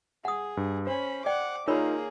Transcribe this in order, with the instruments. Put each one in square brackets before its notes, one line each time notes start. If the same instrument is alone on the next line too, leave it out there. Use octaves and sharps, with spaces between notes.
[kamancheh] G#4 [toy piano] F#5 D#6
[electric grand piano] G2
[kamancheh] C#4 B5 [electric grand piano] C5
[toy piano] D5 G5 [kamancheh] F#5 D6
[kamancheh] A#3 G#4 [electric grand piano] D#4 F4 [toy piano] A#4 C#5 B5